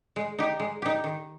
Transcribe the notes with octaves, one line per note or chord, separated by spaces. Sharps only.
G#3
D#4 G4
G#3
D#4 G4
D#3